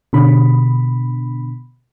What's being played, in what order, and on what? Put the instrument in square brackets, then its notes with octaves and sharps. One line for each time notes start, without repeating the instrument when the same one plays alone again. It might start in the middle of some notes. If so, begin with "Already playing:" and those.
[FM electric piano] B2 D3 B5